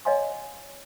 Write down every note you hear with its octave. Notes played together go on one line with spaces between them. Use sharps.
C#5 D#5 F5 G#5 C6